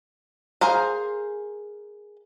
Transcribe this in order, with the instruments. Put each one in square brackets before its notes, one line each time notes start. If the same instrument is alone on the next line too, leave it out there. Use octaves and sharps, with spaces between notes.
[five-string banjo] G#4 A#4 C5 F5